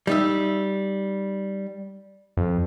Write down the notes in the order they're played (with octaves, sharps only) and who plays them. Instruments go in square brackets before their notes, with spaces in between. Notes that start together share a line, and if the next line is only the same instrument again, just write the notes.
[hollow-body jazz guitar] G3 D#4 E5
[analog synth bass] F2